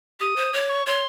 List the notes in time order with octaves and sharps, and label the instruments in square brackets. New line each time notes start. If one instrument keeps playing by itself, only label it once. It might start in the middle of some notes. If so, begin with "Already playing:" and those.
[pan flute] G4 [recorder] D#6
[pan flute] C5
[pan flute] C#5 [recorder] D6
[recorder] C#6
[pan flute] C#5 [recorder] C6